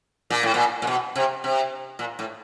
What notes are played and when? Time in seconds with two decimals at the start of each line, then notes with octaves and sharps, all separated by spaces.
0.30 A#2
0.43 A2
0.54 A#2
0.82 A#2
0.87 B2
1.16 C3
1.44 C3
1.99 A#2
2.19 A2